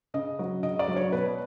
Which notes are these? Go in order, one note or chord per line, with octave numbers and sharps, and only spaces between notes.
C#3 D#5
F#3
C#3 D#5
D5
F#3
C#5
B2 B4